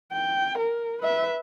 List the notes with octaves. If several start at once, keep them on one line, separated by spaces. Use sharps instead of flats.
G5
A#4
B4 E5